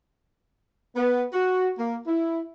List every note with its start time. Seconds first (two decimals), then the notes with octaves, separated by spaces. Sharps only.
0.96 B3
1.33 F#4
1.78 A#3
2.08 E4